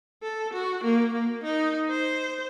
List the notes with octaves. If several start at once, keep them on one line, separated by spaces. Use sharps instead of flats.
A4
F#4
A#3
A#3
D#4
C5